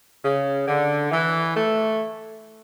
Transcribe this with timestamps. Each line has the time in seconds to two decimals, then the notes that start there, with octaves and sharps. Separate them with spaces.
0.24 C#3
0.67 D3
1.11 E3
1.56 A3